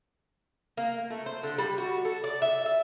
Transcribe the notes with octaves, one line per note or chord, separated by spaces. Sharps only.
A#3
A3
C5
D3
G3
F#4
A4
D5
E5
E5